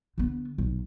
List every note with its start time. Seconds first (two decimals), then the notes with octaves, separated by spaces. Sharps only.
0.18 D3 B3
0.58 B1